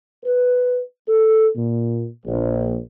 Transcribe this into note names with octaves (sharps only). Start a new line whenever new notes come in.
B4
A4
A#2
A#1